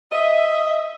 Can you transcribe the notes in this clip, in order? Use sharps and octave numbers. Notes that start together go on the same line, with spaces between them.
D#5 E5